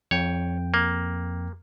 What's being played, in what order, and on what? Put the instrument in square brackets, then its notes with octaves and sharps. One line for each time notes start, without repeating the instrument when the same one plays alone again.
[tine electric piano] F2 G5 [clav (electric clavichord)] C#5
[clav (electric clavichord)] A#3